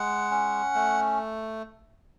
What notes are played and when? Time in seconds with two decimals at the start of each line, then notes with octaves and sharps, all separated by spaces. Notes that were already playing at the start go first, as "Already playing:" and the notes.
Already playing: G#3 F#5
0.31 C#4
0.75 A3